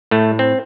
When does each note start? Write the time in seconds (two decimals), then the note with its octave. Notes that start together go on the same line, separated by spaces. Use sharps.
0.11 A2 A3
0.39 C4